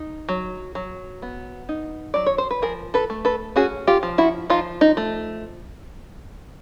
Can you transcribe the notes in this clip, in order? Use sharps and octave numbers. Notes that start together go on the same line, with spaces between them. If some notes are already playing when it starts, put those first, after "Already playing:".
Already playing: D#4
F#3
F#3
B3
D#4
F#3 D5
C#5
C5
B4
F3 G#4 A#4
A4 B4
A3
A4 B4
C#4 F#4 G#4
F4 G4
F3
E4 F#4
F3 D#4 F4
D#4
A3